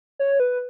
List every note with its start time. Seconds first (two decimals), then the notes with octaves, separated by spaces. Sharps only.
0.19 C#5
0.40 B4